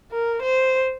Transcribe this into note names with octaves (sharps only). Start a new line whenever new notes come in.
A#4
C5